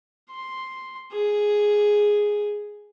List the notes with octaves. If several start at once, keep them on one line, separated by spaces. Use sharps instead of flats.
C6
G#4